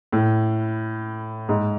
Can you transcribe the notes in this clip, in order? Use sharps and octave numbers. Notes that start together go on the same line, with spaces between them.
A2
G#2